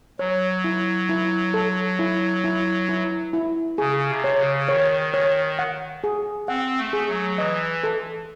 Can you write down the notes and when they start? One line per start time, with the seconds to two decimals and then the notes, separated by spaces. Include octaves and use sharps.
0.19 F#3 C#5
0.64 E4
1.09 E4
1.54 A4
1.99 E4
2.44 E4
2.89 E4
3.33 E4
3.78 C#3 G#4
4.09 C3
4.24 C#5
4.39 C#3
4.69 D#3 C#5
5.14 C#5
5.59 F#5
6.04 G#4
6.48 C4 F#5
6.79 A3
6.93 G#4
7.08 F#3
7.38 E3 D#5
7.84 A4